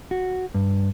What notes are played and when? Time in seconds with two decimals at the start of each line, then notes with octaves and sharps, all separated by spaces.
0.11 F#4
0.54 G2